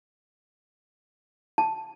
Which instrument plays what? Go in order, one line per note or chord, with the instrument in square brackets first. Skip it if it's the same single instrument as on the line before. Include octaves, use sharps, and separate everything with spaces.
[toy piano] A5